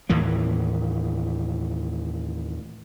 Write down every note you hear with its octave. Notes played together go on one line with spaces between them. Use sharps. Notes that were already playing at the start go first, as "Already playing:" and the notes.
D#2 A2 E3 A#3